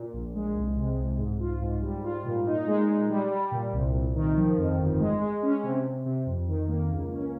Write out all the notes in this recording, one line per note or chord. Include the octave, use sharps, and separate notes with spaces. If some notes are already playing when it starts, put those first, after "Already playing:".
Already playing: A#2
A#1
G#3
C2
C3
C2
G#2
F4
G#2
G3
F4
A#2
D#4
G#3
G#3
G3
G3
A#2
C2
C2
D#3
F3
F2
G1
G#3
G#3
C#4
C3
C3
C3
F2
D#3
A#3
C#2
C#4